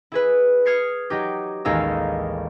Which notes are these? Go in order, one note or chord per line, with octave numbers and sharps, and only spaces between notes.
E4 G#4 B4
D#6 F6 G#6 C7 C#7
F#3 D#4 G4
A1 D#2 G#3 D#4 F5 E6